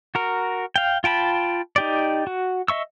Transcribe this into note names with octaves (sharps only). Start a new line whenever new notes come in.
F#4 A#4
F5 G5
F4 G5 A5 B5
D#4 G4 D5
F#4
D#5 E5 C#6 E6